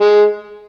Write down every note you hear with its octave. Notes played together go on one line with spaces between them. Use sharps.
G#3